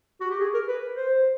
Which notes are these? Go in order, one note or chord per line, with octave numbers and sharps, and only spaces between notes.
F#4
G4
G#4
A#4
B4
C5